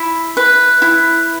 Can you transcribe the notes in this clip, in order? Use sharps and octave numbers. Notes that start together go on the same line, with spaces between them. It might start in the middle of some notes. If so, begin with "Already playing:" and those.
Already playing: E4 B5
B4
E4